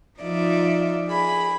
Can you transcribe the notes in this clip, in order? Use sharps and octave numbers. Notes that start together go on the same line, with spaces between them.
F3 D#4 F4 D5 E5
G#4 B5